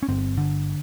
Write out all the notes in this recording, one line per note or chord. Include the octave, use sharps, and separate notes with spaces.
C#4
G1 C4
D3